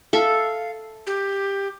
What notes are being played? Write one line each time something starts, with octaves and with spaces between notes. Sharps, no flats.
A4 E5 F5
G4